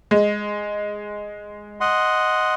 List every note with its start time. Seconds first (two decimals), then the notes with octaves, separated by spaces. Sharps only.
0.11 G#3
1.81 D#5 F#5 C6